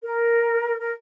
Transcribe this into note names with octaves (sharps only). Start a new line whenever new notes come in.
A#4
A#4